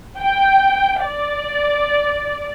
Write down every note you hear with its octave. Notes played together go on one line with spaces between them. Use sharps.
G5
D5